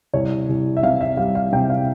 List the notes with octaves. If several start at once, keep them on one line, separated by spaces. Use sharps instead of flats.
C2 C#5
C2
E5
C3 F5
E5
G3 F5
F5
C3 G5
F5